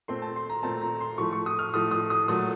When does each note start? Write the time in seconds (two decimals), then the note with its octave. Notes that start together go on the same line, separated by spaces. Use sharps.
0.08 A#2 A3 C4 C6
0.22 A5
0.36 C6
0.50 A#5
0.63 A#2 A3 C4 A5
0.82 A#5
1.00 C6
1.18 A2 F3 A3 C#6
1.33 C#6
1.46 D#6
1.59 F6
1.74 A2 F3 A3 D#6
1.91 D#6
2.10 D#6
2.28 A#2 F#3 A3 D#6